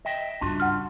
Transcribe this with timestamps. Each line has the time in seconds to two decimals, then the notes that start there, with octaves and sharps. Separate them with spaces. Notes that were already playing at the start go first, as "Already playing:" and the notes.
0.05 D#5 E5 G5
0.41 G2 C#3 D4 F4 F#4
0.60 F#5 F6